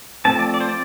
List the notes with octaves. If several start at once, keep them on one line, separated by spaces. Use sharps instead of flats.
F3 A3 C4 A5
D5
D5
C5
D5